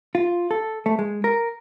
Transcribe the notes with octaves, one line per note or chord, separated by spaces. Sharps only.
F4
A4
A3
G#3
A#4